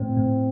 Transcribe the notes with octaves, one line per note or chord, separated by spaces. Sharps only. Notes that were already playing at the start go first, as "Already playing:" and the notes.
Already playing: A2 C4
A2